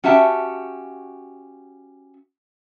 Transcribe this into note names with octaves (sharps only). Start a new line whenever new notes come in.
C#4 F#4 G4 E5 A5